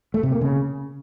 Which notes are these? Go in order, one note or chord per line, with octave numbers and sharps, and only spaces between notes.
A3
C3
A#3
C#3